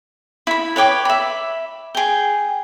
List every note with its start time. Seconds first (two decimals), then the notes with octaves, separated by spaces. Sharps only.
0.47 E4 B5
0.76 B4 C#5 G5 D6
1.05 E5 B5
1.95 G#4 G5